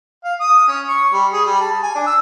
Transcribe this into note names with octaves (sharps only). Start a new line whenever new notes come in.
F5
D#6
C#4
C#6
G3
G#4
G3
A5
G#5
D4
E6